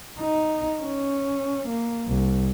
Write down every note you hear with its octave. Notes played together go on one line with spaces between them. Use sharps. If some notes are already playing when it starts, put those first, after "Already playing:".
D#4
C#4
A#3
C2